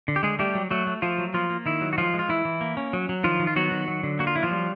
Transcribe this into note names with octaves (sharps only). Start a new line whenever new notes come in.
D3
G4
D3 G#3 G#4
G3 A3 G4
F#3
F#3 A3 F#4
A3
F3 A3 F4
F#3
F3 A#3 F4
A#3
D#3 E4
F#3
F#4
F3 G#3 F4
G#3
F4
E3 E4
E3
A#3
C#4
F#3
F#3
D#3 F3 F4
D#3
F4
F#3 B3 F#4
D#3
F#3
D3
A#3 F#4
F4
F#3 E4
F3 F4
G3